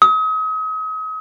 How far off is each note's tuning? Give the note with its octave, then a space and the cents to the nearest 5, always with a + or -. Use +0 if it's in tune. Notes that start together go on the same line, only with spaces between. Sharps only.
D#6 +40